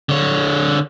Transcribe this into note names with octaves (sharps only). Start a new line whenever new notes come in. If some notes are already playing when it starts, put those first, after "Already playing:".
D3 C#5